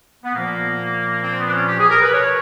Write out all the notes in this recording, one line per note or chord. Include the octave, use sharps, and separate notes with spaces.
B3
A#2 F3 A#3
C4
B3
D4
C#4
G4
G#4
A#4
B4
B2 C#5